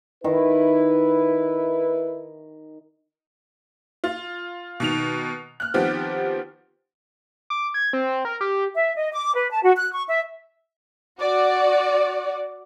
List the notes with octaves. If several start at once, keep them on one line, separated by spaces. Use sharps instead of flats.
D#3 E4 B4
F4
B2 D#3 F7
F6 F#6
D#3 F3 B3 C4 G4
D6
G#6
C4
A#4
G4
E5
D#5
D6
B4
A5
F#4
F#6
C#6
E5
F#4 D5